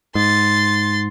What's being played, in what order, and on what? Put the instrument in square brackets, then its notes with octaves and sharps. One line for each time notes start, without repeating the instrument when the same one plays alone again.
[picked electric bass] G#2 [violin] C6 A6